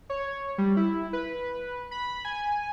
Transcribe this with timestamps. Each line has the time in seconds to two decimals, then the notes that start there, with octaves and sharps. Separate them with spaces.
0.10 C#5
0.58 G3
0.77 E4
1.13 B4
1.91 B5
2.25 G#5